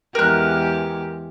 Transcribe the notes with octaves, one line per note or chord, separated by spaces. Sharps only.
E2 G#3 G4 A#4 F#6